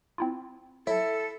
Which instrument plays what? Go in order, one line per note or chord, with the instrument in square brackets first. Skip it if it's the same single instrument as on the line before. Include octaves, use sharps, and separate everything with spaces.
[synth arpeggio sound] C4 E4 F4
[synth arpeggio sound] F#3 [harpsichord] E4 [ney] A4